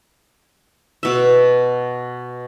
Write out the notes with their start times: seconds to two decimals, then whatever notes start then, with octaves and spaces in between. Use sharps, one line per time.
1.03 B2 E5